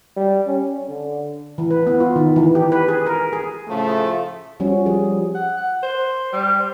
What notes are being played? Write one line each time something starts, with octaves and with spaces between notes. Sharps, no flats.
G3
C#4
D3
E3
B4
B3
F4
D#3
E3
G4
B4
G#4
A#4
G#4
A2 C#3 F3 A3
F3 G3 C#4 F#4
F3 G3 G#4
F#5
F#5
C5
G3
C5